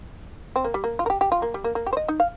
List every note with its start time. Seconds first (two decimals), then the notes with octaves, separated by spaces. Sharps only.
0.56 C4
0.64 A#3
0.74 G3
0.84 A#3
0.99 F4
1.06 A#4
1.10 G4
1.21 G4
1.32 F4
1.42 A#3
1.54 G3
1.64 A#3
1.75 A#3
1.86 G4
1.93 C5
1.97 D#5
2.08 D#4
2.20 F5